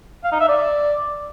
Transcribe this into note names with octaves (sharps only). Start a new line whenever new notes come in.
F5
D#4
E5
D5